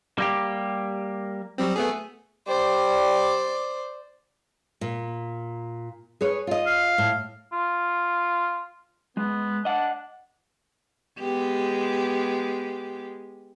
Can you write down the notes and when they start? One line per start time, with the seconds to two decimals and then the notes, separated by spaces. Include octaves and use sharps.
0.18 G3 A#3 G4
1.58 F#3 G3 C4
1.76 A3 B3 G#4
2.48 G3 C5 D5
4.81 A#2
6.21 G#4 B4 C#5
6.47 F4 D#5
6.66 F5
6.98 A2
7.52 F4
9.17 G#3 B3
9.65 D4 D#5 F#5
11.19 G#3 B3 G4